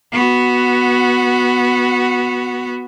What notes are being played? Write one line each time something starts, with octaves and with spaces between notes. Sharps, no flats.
B3 F#4